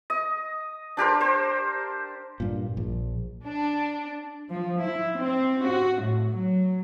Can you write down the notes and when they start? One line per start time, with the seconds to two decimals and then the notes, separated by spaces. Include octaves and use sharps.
0.10 D#5
0.97 D4 G4 A#4 C5
1.21 C5
2.40 G2 A#2
2.77 A#1
3.45 D4
4.53 F3
4.82 E4
5.21 C4
5.66 F#4
6.03 A2
6.32 F#3